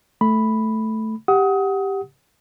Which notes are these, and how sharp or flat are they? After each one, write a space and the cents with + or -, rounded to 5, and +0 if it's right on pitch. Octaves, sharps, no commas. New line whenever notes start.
A3 +0 B5 +0
G4 +0 F#5 +0 D#6 +25